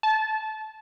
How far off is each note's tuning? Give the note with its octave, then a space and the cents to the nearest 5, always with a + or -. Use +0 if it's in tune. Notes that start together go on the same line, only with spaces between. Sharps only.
A5 -20